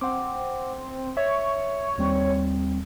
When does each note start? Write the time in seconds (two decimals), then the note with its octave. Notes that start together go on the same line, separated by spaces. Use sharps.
0.01 C4 F#5 D6
1.17 C#5 E5
1.98 D#2 G3 C4